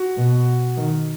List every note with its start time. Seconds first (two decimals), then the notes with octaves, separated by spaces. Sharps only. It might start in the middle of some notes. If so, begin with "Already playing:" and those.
Already playing: F#4
0.17 B2
0.77 D#3